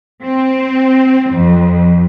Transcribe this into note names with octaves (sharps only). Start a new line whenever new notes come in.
C4
F2